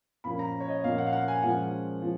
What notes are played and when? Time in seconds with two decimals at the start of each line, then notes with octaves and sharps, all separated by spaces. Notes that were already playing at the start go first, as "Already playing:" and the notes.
0.24 A#2 F3 A#3 C#4 B5
0.39 A#5
0.60 C#5
0.69 D#5
0.83 A#2 F3 A#3 C#4 F5
0.98 F#5
1.07 F5
1.13 F#5
1.28 G#5
1.43 A#2 F3 G#3 C#4 F#5
2.02 F3